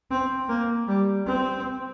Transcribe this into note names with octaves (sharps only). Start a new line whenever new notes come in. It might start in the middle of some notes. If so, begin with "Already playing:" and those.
C4
A#3
G3
C4